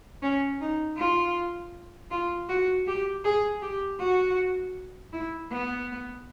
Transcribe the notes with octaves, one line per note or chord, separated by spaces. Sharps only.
C#4
D#4
F4
F4
F#4
G4
G#4
G4
F#4
E4
B3